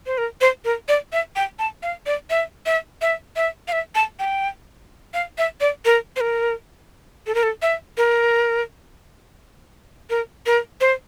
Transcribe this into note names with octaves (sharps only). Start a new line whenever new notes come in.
C5
A#4
C5
A#4
D5
E5
G5
A5
F5
D5
E5
E5
E5
E5
F5
E5
A5
G5
F5
E5
D5
A#4
C5
A#4
A4
A#4
A4
E5
A#4
A#4
A#4
C5